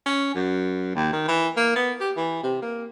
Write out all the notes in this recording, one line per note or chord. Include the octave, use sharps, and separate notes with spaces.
C#4
F#2
D#2
D#3
E3
A#3
B3
G4
E3
C3
A#3